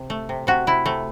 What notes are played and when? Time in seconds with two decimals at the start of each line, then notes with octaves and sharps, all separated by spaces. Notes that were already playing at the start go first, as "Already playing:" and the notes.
Already playing: C3
0.10 A3
0.29 C3
0.47 C3 F#4
0.67 C3 E4
0.86 C3 A3